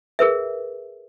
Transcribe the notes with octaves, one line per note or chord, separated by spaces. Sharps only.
G#4 A#4 B4 E5